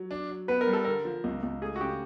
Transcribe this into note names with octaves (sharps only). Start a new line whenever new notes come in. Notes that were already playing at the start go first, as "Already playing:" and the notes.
Already playing: F#3
D4
F#3
B3 B4
A#4
G3
A4
D3 A#4
F3
C#2
C#2
A3 G#4
F#4
C#3 G4